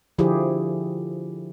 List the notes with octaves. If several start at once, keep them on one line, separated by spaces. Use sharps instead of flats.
D3 F3 E4 G4 G#4